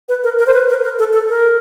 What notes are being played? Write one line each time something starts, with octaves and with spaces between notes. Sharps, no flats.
B4
A#4
A#4
C5
B4
A#4
A#4
A4
A4
A#4